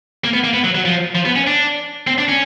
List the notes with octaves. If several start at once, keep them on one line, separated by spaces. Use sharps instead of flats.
A#3
B3
A#3
B3
F#3
F#3
F3
F3
B3
C#4
D4
C4
D4
C#4